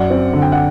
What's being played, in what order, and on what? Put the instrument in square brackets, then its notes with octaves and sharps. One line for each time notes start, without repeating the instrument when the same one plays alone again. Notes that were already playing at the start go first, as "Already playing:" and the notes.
Already playing: [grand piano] F#2 D5 F#5
C4
D3
G5
F#5